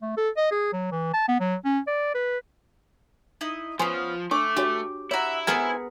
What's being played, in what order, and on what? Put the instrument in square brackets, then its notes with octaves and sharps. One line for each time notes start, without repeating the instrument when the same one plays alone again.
[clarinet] A3
A4
D#5
G#4
F#3
E3
A5
B3
F#3
C#4
D5
B4
[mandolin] D#4 E4 D#5
[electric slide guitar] F3 [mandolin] B3 C#4 [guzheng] C5 [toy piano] G#5
[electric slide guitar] A3 [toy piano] D4 C#5 C#6 [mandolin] D6
[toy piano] D4 F#4 C#5 [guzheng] G4
[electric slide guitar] E4 [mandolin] F#4 E5 [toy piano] C#5 A#5
[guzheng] B3 G#4 A#4 [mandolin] C4 G#5